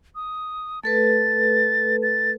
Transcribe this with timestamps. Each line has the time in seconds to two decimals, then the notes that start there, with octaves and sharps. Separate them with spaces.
0.15 D#6
0.83 A3 A4 B4 A6
2.03 A6